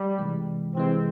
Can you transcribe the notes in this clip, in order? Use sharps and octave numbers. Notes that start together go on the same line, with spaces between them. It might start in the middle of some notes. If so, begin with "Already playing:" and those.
Already playing: G3
C3 E3 G#3
C3 E3 G#3 C4